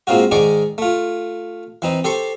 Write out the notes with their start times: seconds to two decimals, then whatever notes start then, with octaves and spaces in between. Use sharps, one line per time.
0.07 G#2 A#3 C4 F4 F#4
0.31 G#2 D#3 G#4 D5 C#6 D6
0.78 A3 F4
1.82 E3 C4 D#4
2.04 G4 A4 C5 C6 C#6